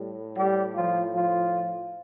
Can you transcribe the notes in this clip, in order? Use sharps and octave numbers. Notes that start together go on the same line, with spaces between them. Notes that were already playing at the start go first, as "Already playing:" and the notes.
Already playing: A2 G3
G3 G4
F3 F4
F3 F4